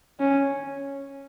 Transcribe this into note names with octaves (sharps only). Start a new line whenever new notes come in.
C#4